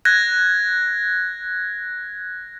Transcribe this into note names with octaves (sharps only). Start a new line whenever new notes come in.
F#6 G#6 A#6